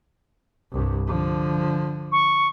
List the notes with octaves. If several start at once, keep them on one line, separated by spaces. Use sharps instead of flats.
C2 G2
D3 F3
C#6